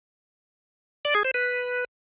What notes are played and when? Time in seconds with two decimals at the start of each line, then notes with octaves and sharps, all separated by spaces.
1.05 D5
1.15 G#4
1.25 C5
1.34 B4